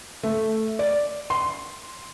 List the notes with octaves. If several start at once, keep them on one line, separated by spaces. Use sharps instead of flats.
A3
D5
C6